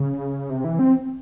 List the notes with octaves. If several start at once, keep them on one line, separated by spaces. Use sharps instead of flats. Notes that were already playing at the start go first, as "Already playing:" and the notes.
Already playing: C#3
C3
E3
C4